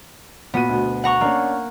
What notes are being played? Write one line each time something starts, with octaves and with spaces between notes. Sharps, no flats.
A#2 B3 F#4 D#7
D2 B2
F#5 A#5 C#6
A#3 C#4 D4